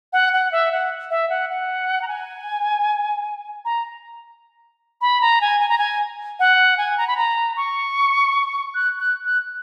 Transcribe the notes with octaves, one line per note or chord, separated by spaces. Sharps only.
F#5
F#5
E5
F#5
E5
F#5
F#5
A#5
G#5
A#5
B5
A#5
G#5
G#5
A#5
G#5
F#5
G#5
A#5
B5
A#5
C#6
F#6
F#6
F#6